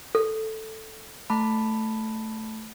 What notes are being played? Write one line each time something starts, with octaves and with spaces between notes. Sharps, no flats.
A4
A3 A5 B5